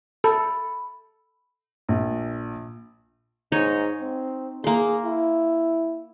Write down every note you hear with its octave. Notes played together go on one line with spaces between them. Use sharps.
A4 B5
A#1
G#2 D#4 C#5 D#5
C4
A#3 G#4 C6
E4